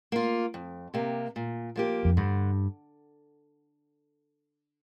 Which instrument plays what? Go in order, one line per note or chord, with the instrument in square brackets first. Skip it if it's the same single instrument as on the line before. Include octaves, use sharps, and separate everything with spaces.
[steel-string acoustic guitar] A#3 F4
F2
C3 A#3 G4
A#2
F3 A#3 G4
[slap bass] F2
[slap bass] G2 [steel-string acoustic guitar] D3